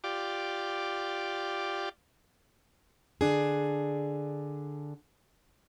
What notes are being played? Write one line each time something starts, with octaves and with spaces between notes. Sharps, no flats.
F4 G4 D5
D3 D4 G#4